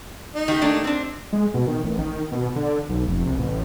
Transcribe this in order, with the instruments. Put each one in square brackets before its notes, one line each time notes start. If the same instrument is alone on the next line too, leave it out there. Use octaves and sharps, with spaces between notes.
[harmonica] D#4
[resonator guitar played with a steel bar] D#3 A3 G4
A3 A#3 D4
C4 D4
[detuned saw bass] G#3
B2
D#3
A1
D#3
B2
D3
B1
F1
C2
A1